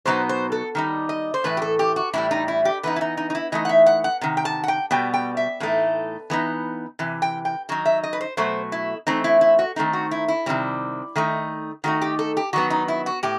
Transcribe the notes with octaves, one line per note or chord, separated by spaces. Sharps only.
B2 F#3 B3 D#4 C5
C5
A4
D#3 G3 D#4
D#5
C5
A2 E3 A3 B4
G4
A4
G4
F#4
A2 E3 G3 E4
D#4
E4
G4
E3 B3 D#4 B4
E4
D#4
D#4
D#4
E4
E3 A3 D#4 D#5
F#5
E5
F#5
F#5
C3 D#3
G5
A5
F#5
G5
B2 G3 B3 G5
G5
E5
A2 E3 A3 D#4
E3 B3 D#4
C3 E3
G5
G5
D#3 F#3 D#4
E5
D#5
B4
C5
B2 F#3 A3 C5
E4
E3 A3 C4 D#4
E4
E4
F#4
D#3 A3 C4 D#4
F#4
E4
E4
C3 D#3 G3 C4
D#3 A3 D#4
D#3 A3 D#4 F#4
G4
A4
G4
D#3 F#3 B3 F#4
D#4
E4
F#4
A2 G4